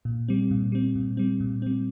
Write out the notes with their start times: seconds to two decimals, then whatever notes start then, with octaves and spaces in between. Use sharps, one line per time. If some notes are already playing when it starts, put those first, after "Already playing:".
0.05 A#2
0.28 G3 C4
0.51 A#2
0.72 G3 C4
0.96 A#2
1.17 G3 C4
1.40 A#2
1.62 G3 C4